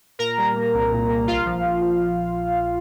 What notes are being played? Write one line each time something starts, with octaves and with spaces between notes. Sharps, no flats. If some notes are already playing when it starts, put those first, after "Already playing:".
A#2 A#4 A#5
G3
A#3
C2
A#2
A#3
A#1 F4 F5
F3
A#1
F3